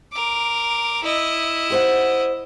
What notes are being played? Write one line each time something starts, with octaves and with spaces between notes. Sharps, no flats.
A#4 D6
E4 D#5
G4 C5 F#5